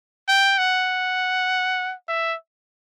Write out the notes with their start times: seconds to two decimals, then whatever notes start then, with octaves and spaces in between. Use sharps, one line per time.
0.28 G5
0.58 F#5
2.08 E5